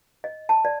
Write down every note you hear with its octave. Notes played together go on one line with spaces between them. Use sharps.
D#5
A5
D5